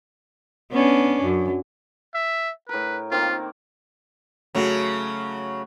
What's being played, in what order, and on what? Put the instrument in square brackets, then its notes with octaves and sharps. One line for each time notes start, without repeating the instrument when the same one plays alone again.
[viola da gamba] B3 C#4 D4
F#2
[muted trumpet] E5
[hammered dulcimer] A2 A#4 [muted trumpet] B4
[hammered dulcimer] D#3 A#3 C4 [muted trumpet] F4
[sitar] C#3 F#3 [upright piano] A3 F#4